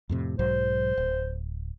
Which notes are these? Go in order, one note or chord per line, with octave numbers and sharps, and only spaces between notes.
F2 A2 C3
B1 G#2 F#3 C5
D1